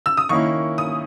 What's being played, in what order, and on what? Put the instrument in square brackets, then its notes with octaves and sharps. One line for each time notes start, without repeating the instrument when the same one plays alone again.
[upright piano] E6
D#6
[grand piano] D#3 A#3 C#4 E4 [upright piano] C#6
[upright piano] D#6